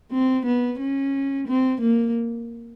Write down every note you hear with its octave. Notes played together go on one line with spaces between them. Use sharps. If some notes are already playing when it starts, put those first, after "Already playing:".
C4
B3
C#4
C4
A#3